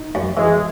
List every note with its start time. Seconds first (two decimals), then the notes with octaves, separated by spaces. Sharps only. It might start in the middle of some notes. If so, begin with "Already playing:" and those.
Already playing: D#4
0.15 F#2
0.37 E3 G#3